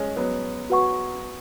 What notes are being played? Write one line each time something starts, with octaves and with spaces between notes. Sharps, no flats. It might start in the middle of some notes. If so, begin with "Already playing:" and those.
Already playing: G#3 C#4
F#3 B3
F#4 B4 F#5 C#6